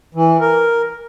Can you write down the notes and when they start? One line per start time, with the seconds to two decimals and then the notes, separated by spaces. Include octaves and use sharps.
0.15 E3
0.40 A#4